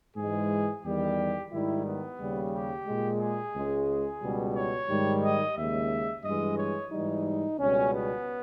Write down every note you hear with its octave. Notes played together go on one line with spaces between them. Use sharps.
G#2 E3 G#3 G#4
E2 D#3 G3 G4
G#2 D#3 G3 E4
B3
D#2 C#3 G3
G4
A#2 G#3
G#4
C#2 C#3 G#3
G#4
C#2 B2 G3
C#5
G#2 D#3 G3
D#5
D#2 C#3 G#3 E5
G2 E3 G#3 D#5
C#5
G#2 E3 G3 D#4
C#2 B2 G3 C#4
B3